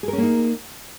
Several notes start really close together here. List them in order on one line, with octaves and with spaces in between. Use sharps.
G#4 A#4 C#4 A#3 D#4